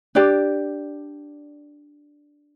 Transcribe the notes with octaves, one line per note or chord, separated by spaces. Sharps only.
D4 G4 D5